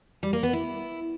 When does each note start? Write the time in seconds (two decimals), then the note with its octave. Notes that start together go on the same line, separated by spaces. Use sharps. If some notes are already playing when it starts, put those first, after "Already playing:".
0.23 G3
0.33 A#3
0.43 B3
0.53 E4